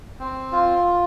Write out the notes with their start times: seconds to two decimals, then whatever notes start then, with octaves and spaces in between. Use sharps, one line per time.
0.20 C4
0.52 F4